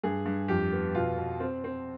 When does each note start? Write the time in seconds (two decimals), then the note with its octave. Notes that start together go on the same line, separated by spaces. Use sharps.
0.03 G2 G#4
0.25 G2
0.48 F2 G4
0.72 B3
0.95 B2 F4
1.17 B2
1.40 C4
1.64 C4